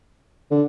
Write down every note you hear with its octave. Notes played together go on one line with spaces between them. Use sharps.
D3